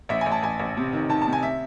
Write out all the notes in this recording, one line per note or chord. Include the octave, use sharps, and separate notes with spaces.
A1 E5
G#5
A1
A5
A1 G#5
A1
C3
D#3
D#3 A5
A5
C3
G#5
E5